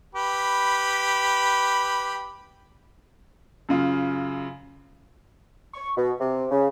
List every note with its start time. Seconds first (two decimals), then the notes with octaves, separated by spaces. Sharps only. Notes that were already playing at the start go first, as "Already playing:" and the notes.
0.15 G4 B4 B5
3.69 F#2 C#3 F4
5.74 C#6
5.97 B2
6.20 C3
6.51 C#3